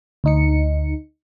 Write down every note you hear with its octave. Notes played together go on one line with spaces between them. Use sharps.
D2 D#4 C#7